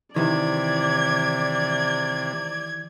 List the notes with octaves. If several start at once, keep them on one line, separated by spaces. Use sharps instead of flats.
C3 D#3 E3 D5 G#6